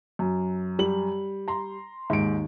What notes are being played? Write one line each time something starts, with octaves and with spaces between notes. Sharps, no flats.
F#2
G3 F#7
A#5 C6
D#2 G#2 D7